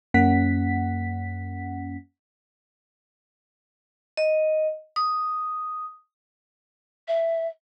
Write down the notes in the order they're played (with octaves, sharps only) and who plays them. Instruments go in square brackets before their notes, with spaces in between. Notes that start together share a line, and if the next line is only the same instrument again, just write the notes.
[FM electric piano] F#2 A#3 C#4 F#5 B6
[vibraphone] D#5
D#6
[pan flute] E5